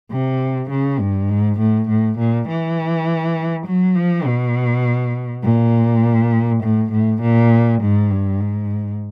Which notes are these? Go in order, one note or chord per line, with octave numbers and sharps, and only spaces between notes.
C3
C#3
G2
G#2
A2
A2
A#2
E3
F#3
F3
B2
A#2
A2
A2
A#2
G#2
G2
G#2